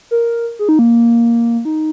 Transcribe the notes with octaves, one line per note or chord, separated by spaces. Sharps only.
A#4
G#4
D#4
A#3
D#4